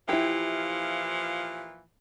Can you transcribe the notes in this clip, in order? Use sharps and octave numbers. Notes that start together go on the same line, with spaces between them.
A#2 E3 F3 E4 G4